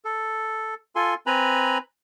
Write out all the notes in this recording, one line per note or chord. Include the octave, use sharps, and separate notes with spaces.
A4
F4 A4 G#5 C6
C4 B4 G#5 A#5 B5